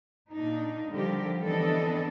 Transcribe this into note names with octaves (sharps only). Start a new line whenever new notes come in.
A#2 D4 D#4
D3 F3 G3 G4 A#4
E3 B3 C4 D4 A4 D#5